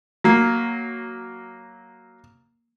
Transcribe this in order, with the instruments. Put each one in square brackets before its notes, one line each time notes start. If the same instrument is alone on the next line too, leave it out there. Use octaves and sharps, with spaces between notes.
[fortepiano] F#3 A#3